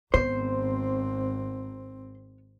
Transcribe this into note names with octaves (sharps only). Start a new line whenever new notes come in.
G#1 B3 C4 C5